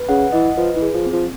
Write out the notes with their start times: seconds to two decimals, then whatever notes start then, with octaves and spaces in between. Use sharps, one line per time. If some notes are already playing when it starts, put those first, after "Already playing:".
Already playing: B4
0.09 C#3 F#5
0.32 E3 D#5
0.57 F3 B4
0.76 E3
0.82 G#4
0.94 F3
1.06 C4
1.12 F3